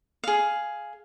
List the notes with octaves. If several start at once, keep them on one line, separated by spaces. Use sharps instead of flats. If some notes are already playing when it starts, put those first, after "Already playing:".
G#4 F5